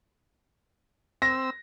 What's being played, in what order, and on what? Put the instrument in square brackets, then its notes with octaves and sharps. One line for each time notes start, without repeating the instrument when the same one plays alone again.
[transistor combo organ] C4 E6 [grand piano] A#6